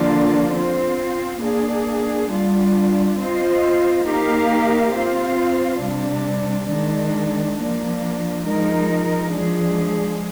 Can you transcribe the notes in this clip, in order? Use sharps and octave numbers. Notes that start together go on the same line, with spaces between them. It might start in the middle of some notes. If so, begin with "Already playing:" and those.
Already playing: D3 F3 A#3 D4 F4
C4 F4 C5
A#3 D4 G#4
G3 D4 F4
C4 F4 C5 D#5
A#3 D#4 G4 A#4 F5
C4 F4 C5 F5
C3 G3 D4
D#3 G#3 D4
F3 A#3 D4
F3 G#3 D#4 A#4
F3 G#3 D4 G#4